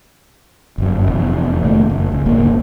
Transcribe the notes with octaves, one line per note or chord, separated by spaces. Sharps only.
G1 F#2
F1 E2
F1 A#2 D#3 A3
F#1
C#2
D1 G1 C#2 A#3